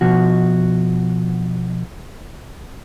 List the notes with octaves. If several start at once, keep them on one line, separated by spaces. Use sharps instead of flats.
B2 F3 F#4